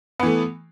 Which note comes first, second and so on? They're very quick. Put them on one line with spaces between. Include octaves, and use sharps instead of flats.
B3 E3 A3